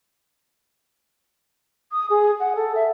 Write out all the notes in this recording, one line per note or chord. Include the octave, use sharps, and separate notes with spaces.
D#6
G#4
F#5
A4
E5